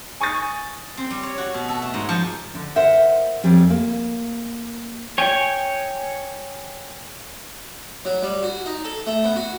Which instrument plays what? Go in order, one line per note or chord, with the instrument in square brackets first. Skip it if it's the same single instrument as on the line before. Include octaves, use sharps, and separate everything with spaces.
[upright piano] G#5 C#6 D#6 A6
[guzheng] C4
G3
C#5
F#4
B2
A4
A3
G#2
F3
[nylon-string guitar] D3
A#4 C5 E5 F#5
F2 G3 C#4
A#3
[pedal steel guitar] C#5 G5 G#5
[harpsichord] F#3
G3
F#4
D#4
A4
A3
B3
F#4